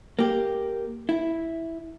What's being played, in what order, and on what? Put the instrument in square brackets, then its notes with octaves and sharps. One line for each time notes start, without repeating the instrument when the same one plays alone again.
[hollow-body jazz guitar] A#3 G4
E4